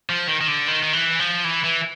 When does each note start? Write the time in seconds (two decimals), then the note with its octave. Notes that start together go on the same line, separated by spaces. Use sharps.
0.09 F3
0.28 D#3
0.41 D#3
0.48 D3
0.68 D#3
0.83 D#3
0.93 E3
1.20 F3
1.44 E3
1.64 E3